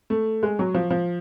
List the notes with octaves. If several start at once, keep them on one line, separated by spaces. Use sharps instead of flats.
A3
G#3
F#3
F3
F3